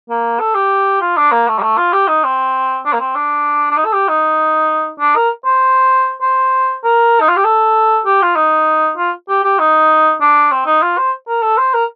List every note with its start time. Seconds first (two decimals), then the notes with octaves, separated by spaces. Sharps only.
0.10 A#3
0.40 A4
0.55 G4
1.01 F4
1.17 D4
1.32 A#3
1.48 A3
1.59 G3
1.63 A3
1.78 F4
1.93 G4
2.08 D#4
2.24 C4
2.86 D4
2.93 A#3
3.00 C4
3.15 D4
3.71 D4
3.77 D#4
3.85 A4
3.93 G4
4.09 D#4
5.00 D4
5.16 A#4
5.46 C5
6.22 C5
6.84 A#4
7.21 D#4
7.29 F4
7.37 G4
7.44 A4
8.06 G4
8.22 F4
8.36 D#4
8.98 F4
9.29 G4
9.44 G4
9.59 D#4
10.21 D4
10.52 C4
10.66 D#4
10.83 F4
10.98 C5
11.28 A#4
11.43 A4
11.58 C5
11.74 A#4